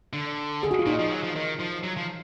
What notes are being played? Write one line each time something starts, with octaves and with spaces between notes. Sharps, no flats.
D3
G#4
F#4
F4
A#2 D#4
F3
F#3
F3
D#3
F3
F#3
F3